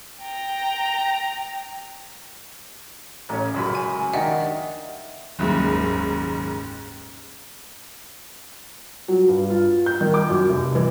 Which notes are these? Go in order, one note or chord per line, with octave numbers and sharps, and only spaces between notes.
G5 A#5
A1 C#4
C#2 F#2 B5
G#5
D#3 D4 D#5 E5 F#5
F#1 D#2 G#2
F#3
G2
F4
G6
D#3
D6
F#2
F1
E3